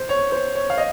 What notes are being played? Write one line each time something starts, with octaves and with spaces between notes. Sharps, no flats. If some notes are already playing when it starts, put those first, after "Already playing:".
Already playing: C5
C#5
C5
C#5
F5
D#5